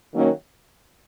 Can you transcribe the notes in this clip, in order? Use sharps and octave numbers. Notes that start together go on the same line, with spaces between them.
D#3 F#3 A#3 C#4